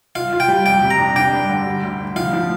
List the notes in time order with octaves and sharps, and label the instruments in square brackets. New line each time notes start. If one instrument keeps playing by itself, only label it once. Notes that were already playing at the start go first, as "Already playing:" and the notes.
[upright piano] F4 [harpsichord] F5
[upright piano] F4
[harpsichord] G5
[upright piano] G3
[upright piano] F2 [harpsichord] G5
[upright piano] C3
[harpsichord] A#5
[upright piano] D4
[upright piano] D4 [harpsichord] G5
[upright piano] G2
D3
G3
D2
D3
[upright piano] F3 [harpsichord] F5
[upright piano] F3